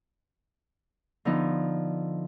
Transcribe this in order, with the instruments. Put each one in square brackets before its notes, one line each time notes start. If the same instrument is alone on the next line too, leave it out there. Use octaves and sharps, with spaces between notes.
[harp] D3 F3 B3 D#4 A4